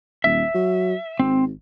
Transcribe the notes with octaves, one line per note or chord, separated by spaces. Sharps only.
D#1 E5
F#3
G#1 C4